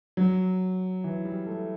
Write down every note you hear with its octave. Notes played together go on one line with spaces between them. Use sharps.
F#3
E3
G3
A3